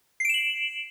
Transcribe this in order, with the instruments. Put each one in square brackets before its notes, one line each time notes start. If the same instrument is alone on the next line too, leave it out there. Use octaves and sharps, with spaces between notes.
[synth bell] C7
D7
E7
F#7